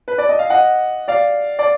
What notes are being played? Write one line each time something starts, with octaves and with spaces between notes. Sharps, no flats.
B4
D5
D#5
F5
D#5 F#5
D5 F5
D5